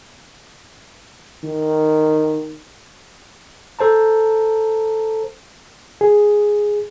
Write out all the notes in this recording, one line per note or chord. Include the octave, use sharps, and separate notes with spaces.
D#3
A4 C5 A5 A#5
G#4